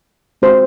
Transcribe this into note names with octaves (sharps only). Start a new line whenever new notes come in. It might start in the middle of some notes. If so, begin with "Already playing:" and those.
G#3 C4 F#4 C5